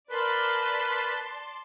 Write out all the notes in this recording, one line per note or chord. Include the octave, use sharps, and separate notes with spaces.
A#4 B4 D5 A5 C6